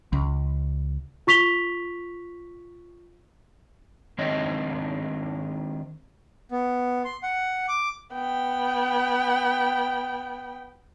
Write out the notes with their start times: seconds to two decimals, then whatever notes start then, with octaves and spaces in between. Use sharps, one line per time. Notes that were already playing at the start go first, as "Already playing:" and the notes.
0.13 C#2
1.27 F4 C#6 B6 F7 G7
4.18 D#3 G#3 C4 D4 C#5 D#5
6.52 B3
7.05 C6
7.23 F#5
7.68 D6
8.13 B3 G5